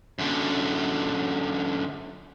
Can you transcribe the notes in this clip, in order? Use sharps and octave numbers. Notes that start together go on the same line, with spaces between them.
F#2 D3